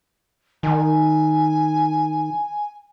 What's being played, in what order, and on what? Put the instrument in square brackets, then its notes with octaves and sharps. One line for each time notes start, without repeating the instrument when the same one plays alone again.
[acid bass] D#3 [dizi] G#5